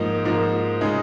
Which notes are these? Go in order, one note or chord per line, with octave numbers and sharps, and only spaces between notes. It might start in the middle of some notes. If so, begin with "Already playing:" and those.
Already playing: G#2 F3 A#3 D#4
G#2 F3 A#3 D#4
C#3 G#3 D#4